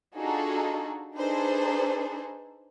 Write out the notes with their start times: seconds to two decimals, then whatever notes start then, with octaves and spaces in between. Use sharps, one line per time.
0.16 D4 D#4 F4 F#4 G#4 A4
1.16 D4 D#4 G#4 A4 B4 C5